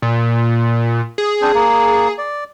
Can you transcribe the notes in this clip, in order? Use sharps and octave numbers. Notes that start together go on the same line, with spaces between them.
A#2
G#4
C4 D4 C5
A#3
D5